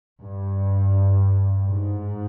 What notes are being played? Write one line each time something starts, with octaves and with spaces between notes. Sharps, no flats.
G2
G#2